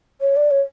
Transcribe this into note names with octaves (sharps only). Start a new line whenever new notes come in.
C#5
D5
C#5